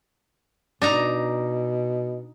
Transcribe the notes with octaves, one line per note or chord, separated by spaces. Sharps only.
B2 D4 D#4 A#5